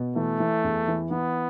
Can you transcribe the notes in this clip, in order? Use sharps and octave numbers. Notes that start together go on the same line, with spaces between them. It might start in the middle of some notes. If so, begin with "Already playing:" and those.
Already playing: B2
E3 A3
E3
E2
E3
E3 B3